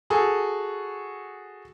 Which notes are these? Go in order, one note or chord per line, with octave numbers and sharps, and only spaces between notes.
F#4 G#4 A4